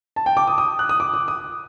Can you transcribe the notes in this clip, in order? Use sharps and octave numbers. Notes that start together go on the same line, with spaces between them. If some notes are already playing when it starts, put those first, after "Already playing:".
A5
G5
D6
D#6
D#6
F#6
D#6
D6
D#6
D#6